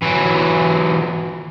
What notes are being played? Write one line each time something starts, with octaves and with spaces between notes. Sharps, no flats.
E3 F#3